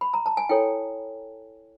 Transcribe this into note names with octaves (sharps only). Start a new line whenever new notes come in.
B5
A#5
A5
G#5
E4 A4 C#5 G5